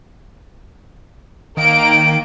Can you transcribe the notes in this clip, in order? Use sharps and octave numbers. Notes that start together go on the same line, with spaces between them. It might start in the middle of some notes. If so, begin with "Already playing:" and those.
D#3 A#3 D7